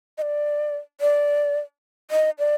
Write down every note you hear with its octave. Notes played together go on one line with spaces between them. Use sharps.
D#5
D5
D5
D#5
D5